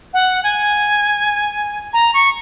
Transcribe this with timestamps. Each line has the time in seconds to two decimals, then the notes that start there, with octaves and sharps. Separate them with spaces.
0.14 F#5
0.44 G#5
1.93 A#5
2.14 C#6